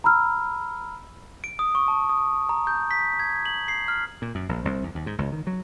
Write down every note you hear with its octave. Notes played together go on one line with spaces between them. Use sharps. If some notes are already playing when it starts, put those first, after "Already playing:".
A#5 B5 E6 F6
D7
D#6
C#6
A5
D#6
A#5
G6
B6
G#6
F#7
C7
F6
A#2
F#2
A#1
C2
E2
D#2
G#2
C#2
D#3
F#3